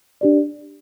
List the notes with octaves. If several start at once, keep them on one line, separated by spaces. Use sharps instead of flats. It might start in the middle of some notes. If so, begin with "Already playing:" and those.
D4 G4 D5